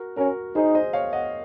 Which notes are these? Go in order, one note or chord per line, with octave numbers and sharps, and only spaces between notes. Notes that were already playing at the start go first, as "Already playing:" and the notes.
Already playing: F#4 A#4
C#4 F#4 A#4
D#4 G#4 C5
C5 D#5
C#5 F5
D#5 F#5